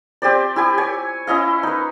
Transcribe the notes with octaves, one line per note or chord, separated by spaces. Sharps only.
C4 G4 C5 D5
E4 G4 G#5
C#5 G#5
C#4 E4 D#5 F5
D#4 B4